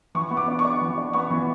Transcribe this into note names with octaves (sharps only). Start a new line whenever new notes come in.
E3 C#6
B3
D6
D4
C#6
D4
E3 D6
D4
B3 C#6
E3